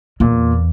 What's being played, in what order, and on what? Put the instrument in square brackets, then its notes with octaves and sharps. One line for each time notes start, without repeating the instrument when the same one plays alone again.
[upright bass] E2 [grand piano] A#2